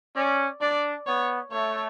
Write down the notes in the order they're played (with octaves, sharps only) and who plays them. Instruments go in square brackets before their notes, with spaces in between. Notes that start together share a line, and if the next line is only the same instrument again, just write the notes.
[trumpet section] C#4 [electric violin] D5
[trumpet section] D4 [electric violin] D5
[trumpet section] B3 [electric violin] C#5
[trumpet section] A3 [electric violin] C#5